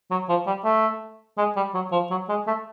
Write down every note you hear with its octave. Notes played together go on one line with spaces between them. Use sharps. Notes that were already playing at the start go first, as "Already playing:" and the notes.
F#3
F3
G3
A3
G#3
G3
F#3
F3
F#3
G#3
A3